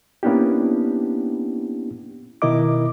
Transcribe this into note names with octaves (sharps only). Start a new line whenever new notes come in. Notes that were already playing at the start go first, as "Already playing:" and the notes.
A#3 B3 C#4 D4 E4 G4
B2 D#3 E4 A#4 D#5 D6